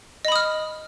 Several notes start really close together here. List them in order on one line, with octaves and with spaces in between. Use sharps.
D#5 B5 D#6 F6